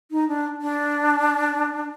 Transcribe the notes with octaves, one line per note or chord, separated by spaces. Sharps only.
D#4
D4
D4